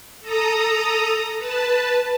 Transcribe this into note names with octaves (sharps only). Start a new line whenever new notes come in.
A4 A#5 D#6
B4 A5